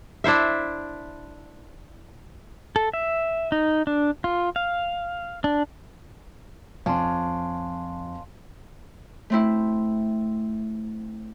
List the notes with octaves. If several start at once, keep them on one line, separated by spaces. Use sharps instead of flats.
D4 E4 C5 E5
A4
E5
D#4
D4
F4
F5
D4
F2 C#4 D4 F5 C6
A3 C4 E4